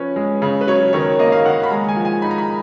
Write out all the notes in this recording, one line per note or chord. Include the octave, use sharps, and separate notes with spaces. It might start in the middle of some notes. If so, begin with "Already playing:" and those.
Already playing: F3 C#4 B4
G#3
C#3
B4
F#3 C#5
D#3 C#5
A#3 D#5
F5
D#3 F#5
B5
G#3 A#5
G#5
F3
G#5
D#4 B5
A#5
B5